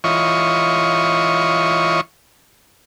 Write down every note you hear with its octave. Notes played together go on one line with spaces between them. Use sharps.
E3 F4 C#5 D#5 C#6